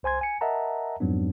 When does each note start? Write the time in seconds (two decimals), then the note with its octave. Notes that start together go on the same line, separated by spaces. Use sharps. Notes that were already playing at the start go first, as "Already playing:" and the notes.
0.03 C2 C5 G#5 C6 G#6
0.21 G#5 C#7
0.41 A#4 D#5 E5 F#5 A5 A#5
1.00 F2 G#2 F#3 B3 D4